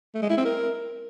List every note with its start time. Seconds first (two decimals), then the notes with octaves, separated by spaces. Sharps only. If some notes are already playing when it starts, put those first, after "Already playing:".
0.14 A3
0.22 G#3
0.30 E4
0.37 C4
0.45 A#4